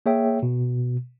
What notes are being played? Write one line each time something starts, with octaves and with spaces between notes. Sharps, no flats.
A#3 G#4 C#5 E5 G5
B2